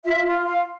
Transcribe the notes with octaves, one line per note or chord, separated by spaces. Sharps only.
F4 E5
F4
F4 F5